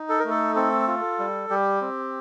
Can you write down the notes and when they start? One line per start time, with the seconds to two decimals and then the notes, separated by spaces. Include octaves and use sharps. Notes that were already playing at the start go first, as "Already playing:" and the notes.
Already playing: D#4
0.09 A4
0.19 A#4
0.25 A3 A4
0.56 C4 A4
0.88 F4
1.19 G3
1.50 G3 G4
1.81 C4